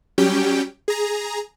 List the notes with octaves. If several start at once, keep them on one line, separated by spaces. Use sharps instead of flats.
F#3 G3 C#4 G4 G5
G#4 A#5